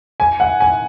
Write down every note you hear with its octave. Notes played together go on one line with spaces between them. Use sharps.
G#5
F#5
G#5